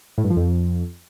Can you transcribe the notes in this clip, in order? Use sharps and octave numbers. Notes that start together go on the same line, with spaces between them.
A2
G2
F3
F2